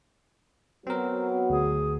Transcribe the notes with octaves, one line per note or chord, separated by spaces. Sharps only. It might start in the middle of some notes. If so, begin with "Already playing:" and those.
F#3 B3 C4 F#4 A#4
D2 G#4